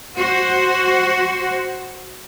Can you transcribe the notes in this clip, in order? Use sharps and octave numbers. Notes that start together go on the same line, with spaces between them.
F#4 C5